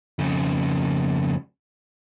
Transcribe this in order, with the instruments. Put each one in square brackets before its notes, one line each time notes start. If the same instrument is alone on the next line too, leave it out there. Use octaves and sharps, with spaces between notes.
[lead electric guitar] F2 C#3